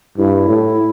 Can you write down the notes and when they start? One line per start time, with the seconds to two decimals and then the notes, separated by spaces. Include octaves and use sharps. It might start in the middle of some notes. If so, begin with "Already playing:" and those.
0.17 G2 E4
0.48 A2